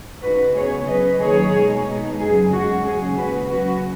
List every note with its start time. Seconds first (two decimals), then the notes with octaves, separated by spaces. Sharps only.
0.23 C#3 G#3 D#4 F#4 B4
0.55 C#3 B3 D#4 G#4 C#5
0.88 C#3 F#3 C#4 B4 D#5
1.21 D#2 D#3 F#3 B3 D#4 G#4 C#5
1.54 B2 G#3 D#4
1.87 B2 B3 D#4
2.19 F#2 C#3 F#3 G#4
2.52 F#2 C#3 G#3 C#4 F#4
2.85 D#2 C#3 F#3 C#4 G#4
3.17 D#2 C#3 G#3 F#4 B4
3.50 C#3 F#3 C#4 F#4 B4